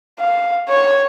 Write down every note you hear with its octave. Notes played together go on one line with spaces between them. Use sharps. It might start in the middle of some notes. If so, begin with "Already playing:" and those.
F5
C#5